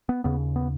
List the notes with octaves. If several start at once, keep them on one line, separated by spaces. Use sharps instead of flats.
B3
D#2 C#3 B3
B3